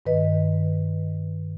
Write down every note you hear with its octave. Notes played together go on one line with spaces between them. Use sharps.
G2 D#3 B4 D#5